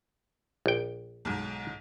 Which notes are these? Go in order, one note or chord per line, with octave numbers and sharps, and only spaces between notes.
A#1 G5
B1 G#2